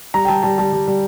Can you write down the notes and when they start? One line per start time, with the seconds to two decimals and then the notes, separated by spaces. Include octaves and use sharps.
0.14 G3 A#5
0.25 G5
0.29 G3 A5
0.43 G3 A5
0.58 G3 A5
0.73 G3
0.88 G3